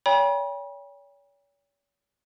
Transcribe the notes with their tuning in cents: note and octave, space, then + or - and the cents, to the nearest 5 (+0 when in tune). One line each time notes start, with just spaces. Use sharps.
C#5 +40 G5 +35 B5 -40